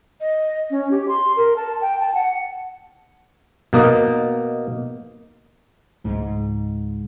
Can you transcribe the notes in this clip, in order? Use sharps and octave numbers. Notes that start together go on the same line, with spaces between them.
D#5
C#4
G4
C6
A#4
A5
G5
A5
F#5
B2 A#3 D#4
C#2 G#2